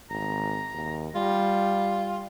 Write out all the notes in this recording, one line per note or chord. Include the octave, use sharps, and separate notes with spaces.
G#1 A#5
D#2
G3 F4